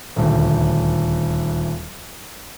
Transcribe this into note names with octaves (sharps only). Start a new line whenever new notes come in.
D#1 D2